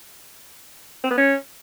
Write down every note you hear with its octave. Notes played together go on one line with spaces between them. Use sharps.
C4
B3
C#4